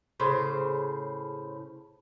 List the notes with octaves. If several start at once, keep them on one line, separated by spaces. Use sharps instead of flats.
A2 C#3 C5